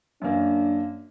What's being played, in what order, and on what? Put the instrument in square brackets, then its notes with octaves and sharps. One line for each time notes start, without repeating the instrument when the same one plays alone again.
[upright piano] F#2 A#3 [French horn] D4